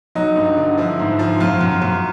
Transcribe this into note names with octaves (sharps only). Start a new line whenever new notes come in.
F#3 D#4
G2
D3
F3 E4
G#2
F3
F#2 F4
F#2
F#2